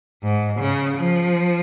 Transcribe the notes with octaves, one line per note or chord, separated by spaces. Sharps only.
G#2
C#3
F3